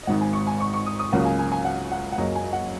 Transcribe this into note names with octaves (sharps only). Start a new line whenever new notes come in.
D#5
G#1 G#2 D#3 F#5
G#5
C#6
G#5
C#6
C#6
D#6
D#6
C#2 C#3 F#3 A#3 F#5
G#5
G#5
G#5
F#5
F#5
F#5
F#1 F#2 F#3 A#3 D#5
G#5
D#5
F#5